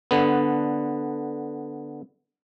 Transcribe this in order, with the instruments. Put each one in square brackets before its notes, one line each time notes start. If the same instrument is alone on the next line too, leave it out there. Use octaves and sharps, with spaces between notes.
[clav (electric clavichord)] D3 B3